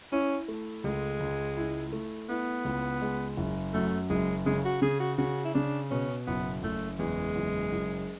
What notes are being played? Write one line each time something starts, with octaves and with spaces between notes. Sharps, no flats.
C#4 E4
A3
C#2 G#3
C#2
E4
A3
B3 E4
C#2
G#3
F#1
F#2 A3
F#1 G#3
C#3 G#3
F#4
C#3 G#4
F#4
C#3 F#4
E4
C#3 D4
B2 C#4
F#1 B3
F#1 A3
E2 G#3
F#1
F#1